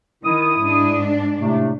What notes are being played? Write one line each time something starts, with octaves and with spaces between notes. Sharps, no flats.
D#3 E4 D#6
G#2 D4
A2 C3 A3